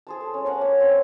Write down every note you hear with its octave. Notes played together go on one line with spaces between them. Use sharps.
G#4 C5 A5
A4
G#3 C#4
A#4 C#5 F5 F#5
A#3 C#5
C4 F5 F#5